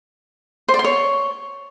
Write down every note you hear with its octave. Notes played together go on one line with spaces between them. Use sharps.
C5
D5
C6
C#5